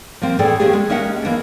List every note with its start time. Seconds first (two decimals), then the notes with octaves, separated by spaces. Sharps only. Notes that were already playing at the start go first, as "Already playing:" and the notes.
0.22 F3 A#3 C4
0.39 A2 E3 G#4 A4 D5 G5
0.60 A3 A#3 C#4 D4 G4 G#4
0.73 G#3
0.90 A#3 C#4 D#5 E5 F#5
1.22 E3 A#3 B3 D4